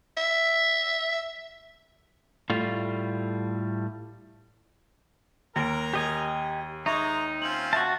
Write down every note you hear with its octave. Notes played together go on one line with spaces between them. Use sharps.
E5
A2 G3 A3 F4
D#2 A#4 A#5 A#6 D7
G4 D#5 G#5
G#3 D#4 E5 A#5 C#6 A#6
C4 C#4 F4 F#7
F#4 E5 A5